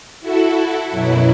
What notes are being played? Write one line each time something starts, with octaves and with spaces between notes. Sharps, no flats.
E4 F#4 A4
F#2 B2 F#3 E4